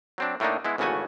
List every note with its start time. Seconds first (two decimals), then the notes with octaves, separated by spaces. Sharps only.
0.18 F#3 C4 D4
0.40 A2 A3 A#3 D4 D#4
0.65 G#3 B3 E4
0.78 G#1 C#3 E3 A3 F#4 G#5